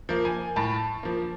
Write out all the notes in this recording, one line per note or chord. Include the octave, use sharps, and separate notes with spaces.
F3 A#3
G#5
A2 A5
F3 A#3